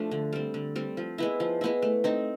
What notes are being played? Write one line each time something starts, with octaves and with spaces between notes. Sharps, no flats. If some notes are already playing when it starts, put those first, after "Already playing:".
Already playing: F3 A3 D4
D3
G3 C4
D3
G3 C4
F3
G#3 B3 E4
F3
G#3 B3 E4
A3
C4 D#4